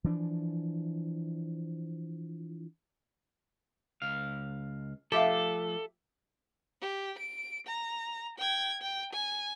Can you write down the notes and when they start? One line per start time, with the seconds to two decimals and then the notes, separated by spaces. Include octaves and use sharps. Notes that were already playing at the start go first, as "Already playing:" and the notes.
0.04 E3 F3 D4
4.02 C#2 F5
5.12 F3 A3 G4 A4 E5 F5
6.81 G4
7.19 D7
7.67 A#5
8.38 G5 G#6
8.82 G5
9.13 G#5